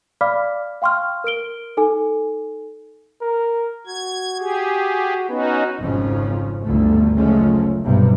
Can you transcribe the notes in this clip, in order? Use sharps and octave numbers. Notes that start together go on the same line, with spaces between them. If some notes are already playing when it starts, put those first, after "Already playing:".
D5 F5 B5 D6 F6 B6
F5 G5 C6 C#6 F6
A#4 F6 D7 G7
D#4 A4 G#5
A#4
F#4 G#6
G4 G#4
B3 C#4 D#4 F#4
G#1 F2 G#2 C#3 F3 C#4
G1 D2 D3 A3
F#1 F3 G#3 A3 C#4
B1 G2 C3